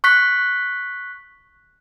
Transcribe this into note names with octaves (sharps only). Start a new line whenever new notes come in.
C#6 F#6 B6